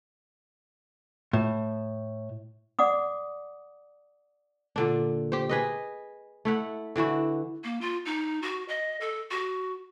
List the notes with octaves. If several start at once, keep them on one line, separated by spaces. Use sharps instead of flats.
A2
D5 F#5 D6 D#6
A#2 D3 D4
G4 C5
G#4 B4 D#5
A3 E4 F#5
D3 E3 E4 F#4
A#3
F4
D#4
F#4
D#5
A4
F#4